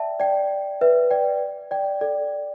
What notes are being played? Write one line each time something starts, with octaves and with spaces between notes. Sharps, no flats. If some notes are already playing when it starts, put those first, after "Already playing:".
Already playing: D5 E5 G5 A5
D5 G5
B4 E5
D5 G5
D5 G5
A4 D5